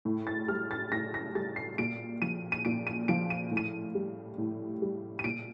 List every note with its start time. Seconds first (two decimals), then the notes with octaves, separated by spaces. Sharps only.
0.05 A2
0.27 A6
0.48 G3 F6
0.71 A6
0.92 A2 A#6
1.14 A#6
1.35 G3 A6
1.56 C7
1.78 A#2 D7
2.22 F3 D#7
2.52 D#7
2.65 A#2 D7
2.87 D#7
3.08 F3 D7
3.30 D#7
3.51 A2
3.57 D#7
3.95 G3
4.38 A2
4.82 G3
5.19 D#7
5.24 A#2 D7